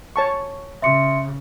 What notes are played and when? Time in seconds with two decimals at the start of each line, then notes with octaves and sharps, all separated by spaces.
0.16 C#5 A5 C#6
0.82 C#3 E5 C6 C#7